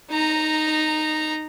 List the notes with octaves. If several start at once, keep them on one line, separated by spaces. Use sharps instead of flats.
D#4 A#5